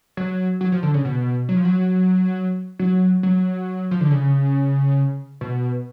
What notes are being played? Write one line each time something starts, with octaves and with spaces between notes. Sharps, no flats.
F#3
F#3
F3
D3
C#3
B2
F#3
F3
F#3
F#3
F#3
F3
D3
C#3
B2